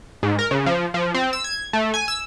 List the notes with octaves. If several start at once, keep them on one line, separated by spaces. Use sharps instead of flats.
G#2
A#4
C#3
F3
F3
C4
E6
G#6
A3
G#5
E6